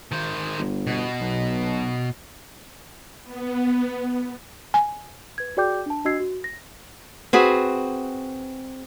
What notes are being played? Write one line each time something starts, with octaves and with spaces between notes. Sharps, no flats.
D#3 C5
G1
B2
B1
B3
G#5
B4 G#6
F#4 G#4 D5 G5 D6 G6
D4 A5
D4 F#4 D#5 E6 G#6 C7
F#4
A#6
C4 F#4 G#4 B4